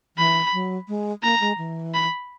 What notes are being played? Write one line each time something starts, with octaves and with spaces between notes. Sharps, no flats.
E3 B5
F#3
G#3
A#3 A#5
G#3
E3
B5